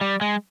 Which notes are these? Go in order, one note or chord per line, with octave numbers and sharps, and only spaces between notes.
G3
G#3